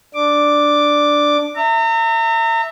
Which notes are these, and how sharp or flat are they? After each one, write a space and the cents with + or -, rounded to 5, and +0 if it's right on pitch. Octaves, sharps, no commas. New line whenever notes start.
D4 +0 D6 +0
E5 -5 A#5 -40